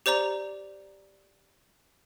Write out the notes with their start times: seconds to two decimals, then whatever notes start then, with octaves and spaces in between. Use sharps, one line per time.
0.06 G4 C5 D5 A#5 F7